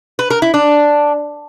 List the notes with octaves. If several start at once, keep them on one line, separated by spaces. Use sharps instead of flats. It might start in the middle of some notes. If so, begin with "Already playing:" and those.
B4
A#4
E4
D4